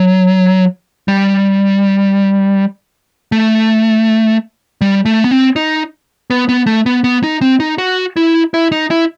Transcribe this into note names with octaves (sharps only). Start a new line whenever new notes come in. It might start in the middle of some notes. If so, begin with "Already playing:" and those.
Already playing: F#3
G3
A3
G3
A3
B3
C4
D#4
B3
B3
A3
B3
B3
D#4
C4
D#4
F#4
E4
E4
D#4
E4